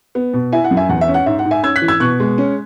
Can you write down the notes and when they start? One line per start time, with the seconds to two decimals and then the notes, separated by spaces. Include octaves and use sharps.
0.15 B3
0.34 B2
0.53 E4 E5 G#5
0.64 F#5
0.71 F#2
0.77 E5 G#5
0.89 E2 F#5
1.01 E5
1.08 C#4
1.14 F#5
1.26 G#2 E5
1.39 F#5
1.45 G#2
1.51 E5 G#5
1.63 C#4 E6 G#6
1.76 F#6 B6
1.82 E3
1.88 E6 G#6
2.00 B2 C#6 F#6
2.20 G#3
2.38 C#4